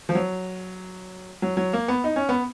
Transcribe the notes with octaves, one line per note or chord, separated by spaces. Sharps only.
F3
F#3
F#3
F#3
A#3
B3
D#4
C#4
B3